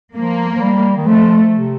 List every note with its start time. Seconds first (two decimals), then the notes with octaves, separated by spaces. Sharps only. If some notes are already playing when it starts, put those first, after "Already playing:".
0.16 F3 A#3
0.56 F3
0.61 G3
0.97 D#3
1.07 F3 A3
1.53 C3